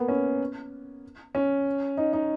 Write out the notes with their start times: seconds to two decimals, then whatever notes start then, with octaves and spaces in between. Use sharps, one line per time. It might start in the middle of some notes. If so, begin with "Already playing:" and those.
Already playing: A#3 B3
0.08 C#4
1.35 C#4
1.97 D#4
2.13 D#4